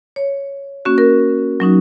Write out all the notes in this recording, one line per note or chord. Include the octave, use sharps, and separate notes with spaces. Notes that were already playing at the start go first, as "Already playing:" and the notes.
C#5
A#3 C#4 F#4
A#4
F#3 C#4 D#4 F#4